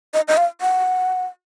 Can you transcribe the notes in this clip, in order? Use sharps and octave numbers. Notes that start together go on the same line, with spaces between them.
D#5
D#5
F5
F#5